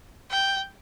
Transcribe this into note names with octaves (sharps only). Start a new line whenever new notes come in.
G5